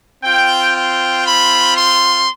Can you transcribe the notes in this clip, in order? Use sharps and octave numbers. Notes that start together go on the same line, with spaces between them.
C4 F4 G5
G5
B5
C6